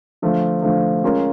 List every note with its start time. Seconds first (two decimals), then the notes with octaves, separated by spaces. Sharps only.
0.22 D3 F3 A3
0.62 D3 F3 A3
1.03 G#3 C#4 F4 A#4